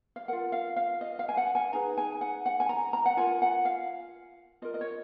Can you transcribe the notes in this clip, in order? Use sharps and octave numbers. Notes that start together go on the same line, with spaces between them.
F5
F4 A#4 F#5
F5
F5
D#5
F5
G#5
F#5
G#5
D#4 G#4 B4 A#5
G#5
F#5
F#5
G#5
A#5
A#5
F#5
F4 A#4 G#5
F#5
F5
F4 A#4 D#5
D#5
C#5